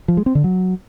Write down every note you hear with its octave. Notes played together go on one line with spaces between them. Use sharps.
F3
G#3
C4
D3
F#3